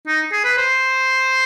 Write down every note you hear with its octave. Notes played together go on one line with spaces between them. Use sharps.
D#4
G#4
B4
C5